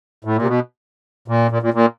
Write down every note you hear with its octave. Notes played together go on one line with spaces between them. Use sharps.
A2
A#2
C3
B2
A#2
A#2
A#2
A#2